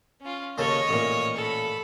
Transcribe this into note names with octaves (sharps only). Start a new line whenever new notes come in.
C#4 F4
D#2 C#3 A4 C#5 D#5
A1 A#2
A4 B5